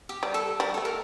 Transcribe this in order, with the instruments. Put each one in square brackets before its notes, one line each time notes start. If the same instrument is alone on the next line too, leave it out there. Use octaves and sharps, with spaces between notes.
[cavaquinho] G4
[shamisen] G3
[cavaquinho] A4
[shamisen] G3 [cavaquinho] A#4
[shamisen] A3 [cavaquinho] A4
[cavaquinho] A#4